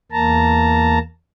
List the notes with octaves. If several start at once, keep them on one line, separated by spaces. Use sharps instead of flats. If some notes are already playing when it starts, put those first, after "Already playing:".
E2 A#3 A5 A#5